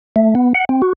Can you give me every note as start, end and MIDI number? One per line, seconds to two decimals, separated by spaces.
0.16 0.34 57
0.35 0.53 59
0.54 0.65 78
0.69 0.82 60
0.82 0.93 66